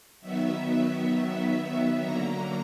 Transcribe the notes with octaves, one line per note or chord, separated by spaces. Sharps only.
D#3 F#3 B3 E5
D3 F#3 A#3 A#5